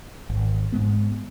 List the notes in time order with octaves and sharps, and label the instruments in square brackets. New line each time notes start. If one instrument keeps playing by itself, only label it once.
[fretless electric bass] G#1
G#2 G#3 B3